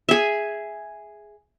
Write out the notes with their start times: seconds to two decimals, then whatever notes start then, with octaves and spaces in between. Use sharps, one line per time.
0.09 G#4 E5